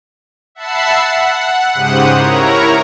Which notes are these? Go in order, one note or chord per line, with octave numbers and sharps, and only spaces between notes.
E5 F#5 A5 B5 E6 C7
F#5
G#2 C#3 G4 C5 F#5 D#6
E4 A#4 C#5 A#5